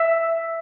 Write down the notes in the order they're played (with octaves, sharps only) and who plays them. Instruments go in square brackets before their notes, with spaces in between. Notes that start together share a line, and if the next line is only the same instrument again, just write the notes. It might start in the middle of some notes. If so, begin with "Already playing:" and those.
Already playing: [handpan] E5